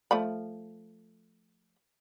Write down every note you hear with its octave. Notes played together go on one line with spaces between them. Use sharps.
F3 A3 B5